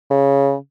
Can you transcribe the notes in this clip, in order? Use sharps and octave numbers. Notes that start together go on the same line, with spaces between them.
C#3